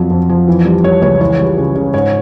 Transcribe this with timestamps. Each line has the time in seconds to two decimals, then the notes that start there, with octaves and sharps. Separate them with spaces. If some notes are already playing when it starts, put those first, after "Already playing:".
Already playing: F2 F3 F#3
0.10 F2
0.29 F3
0.48 E3
0.65 G3
0.84 G3 C#5
1.02 C#2 C#5
1.21 E3 C#5
1.39 G3
1.58 C#3
1.75 C#3
1.94 G#2 C#5